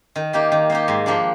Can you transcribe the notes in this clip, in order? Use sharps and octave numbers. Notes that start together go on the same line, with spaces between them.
D#3
A#3 D#4 G4
D#3
A#3 D#4 G4
G#2
F3 A#3 D4 G4